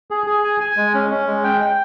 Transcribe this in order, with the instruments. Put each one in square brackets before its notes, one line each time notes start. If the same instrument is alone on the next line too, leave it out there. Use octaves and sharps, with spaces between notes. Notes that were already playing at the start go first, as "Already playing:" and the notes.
[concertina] G#4
G#4
G#5
G#5
G#3
C#4
C#4
G#3
G5
G5